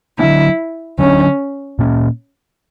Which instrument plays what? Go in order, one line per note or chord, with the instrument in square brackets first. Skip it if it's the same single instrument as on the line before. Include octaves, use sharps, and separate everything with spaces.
[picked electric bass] D3 F#3 B3 D4 [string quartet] E4
[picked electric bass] D3 F#3 B3 D4 [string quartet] C#4
[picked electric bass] A#2 A#3 C#4